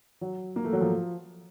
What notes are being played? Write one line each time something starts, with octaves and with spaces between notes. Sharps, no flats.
F#3
A#3
A3
F#3
F3